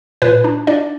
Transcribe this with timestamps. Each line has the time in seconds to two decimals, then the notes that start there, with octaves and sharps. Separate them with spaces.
0.22 A#2 B4
0.44 D4
0.67 D4 D5